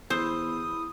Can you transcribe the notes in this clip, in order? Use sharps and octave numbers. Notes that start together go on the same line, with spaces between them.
E2 E4 C5 B5 D#6